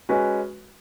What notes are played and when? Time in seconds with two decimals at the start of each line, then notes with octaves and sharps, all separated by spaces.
0.09 G#3 C#4 F#4 B4